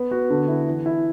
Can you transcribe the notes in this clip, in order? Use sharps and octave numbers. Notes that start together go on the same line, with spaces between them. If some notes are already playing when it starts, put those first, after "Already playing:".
Already playing: B3
F#4
D3
E4
E3
E4